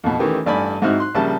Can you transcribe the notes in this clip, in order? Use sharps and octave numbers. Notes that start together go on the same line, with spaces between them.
F2 B2
D#3 E3 A3 C#4 G4
A1 G2 D5 G#5 B5
G#2 C4 D#4 E4 F#4 F6
C6 F#6
A#1 C#3 G3 E5 A5